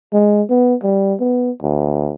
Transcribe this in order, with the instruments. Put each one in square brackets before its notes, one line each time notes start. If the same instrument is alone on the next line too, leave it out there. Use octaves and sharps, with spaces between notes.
[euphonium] G#3
B3
G3
B3
D2